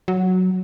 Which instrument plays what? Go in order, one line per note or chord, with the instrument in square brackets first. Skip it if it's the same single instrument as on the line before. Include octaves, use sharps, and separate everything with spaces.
[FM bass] F#3